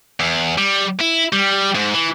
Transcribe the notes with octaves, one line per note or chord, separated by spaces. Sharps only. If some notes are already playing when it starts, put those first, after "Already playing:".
E2
G3
E4
G3
G#2
E3